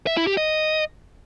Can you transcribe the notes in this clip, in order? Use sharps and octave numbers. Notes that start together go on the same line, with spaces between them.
E5
E4
G4
D#5